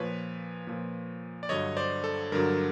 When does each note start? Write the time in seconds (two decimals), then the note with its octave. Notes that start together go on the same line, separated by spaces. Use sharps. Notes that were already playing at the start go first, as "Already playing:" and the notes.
Already playing: A#2 F3 B4 C#5
0.67 A#2 F3
1.43 D5
1.49 G2 D3 F#3 C#5 D#5
1.76 C5 D5
2.04 A4
2.32 G2 D3 F#3 A#4